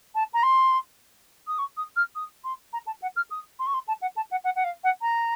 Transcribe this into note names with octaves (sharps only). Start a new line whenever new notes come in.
A5
A#5
C6
D#6
C#6
D#6
F6
D#6
C6
A#5
A5
F#5
F6
D#6
C6
C#6
C6
A5
F#5
A5
F#5
F#5
F#5
F5
F#5
A#5